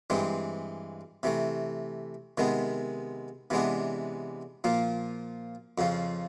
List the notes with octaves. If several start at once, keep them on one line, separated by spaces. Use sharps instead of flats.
G2 E3 G#3 C4
C3 E3 A3
C3 D#3 G#3 B3
C3 E3 G#3 B3 D4
A#2 F3 A#3
F2 C#3 F3